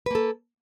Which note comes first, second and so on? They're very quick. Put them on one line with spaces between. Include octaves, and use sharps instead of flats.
B4 A#3 A4